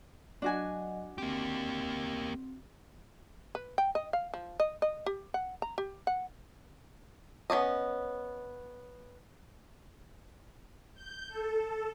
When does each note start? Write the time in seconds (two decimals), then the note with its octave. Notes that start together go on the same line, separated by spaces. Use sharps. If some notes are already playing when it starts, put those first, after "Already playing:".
0.42 F#3 D4 F#4 D#5 G#5
1.18 A#3 C4 G4
3.55 B4
3.78 G5
3.95 D#5
4.13 F5
4.34 F3
4.60 D#5
4.82 D#5
5.06 G4
5.34 F#5
5.62 A#5
5.78 G4
6.07 F#5
7.50 B3 C#4 D5 D#5
10.95 G6
11.29 A4